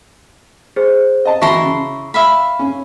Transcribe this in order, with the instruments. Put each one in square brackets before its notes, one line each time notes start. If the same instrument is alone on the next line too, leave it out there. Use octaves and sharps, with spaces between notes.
[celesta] G#4 C5
[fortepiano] D#5 A5
[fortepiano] E3 F#4 A5 [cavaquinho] E4 A#5 C6 [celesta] C#6
[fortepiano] C#3
[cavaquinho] E5 F5 B5
[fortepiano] C#4